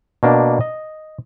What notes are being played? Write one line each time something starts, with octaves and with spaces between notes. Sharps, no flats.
B2 A#3 D4
D#5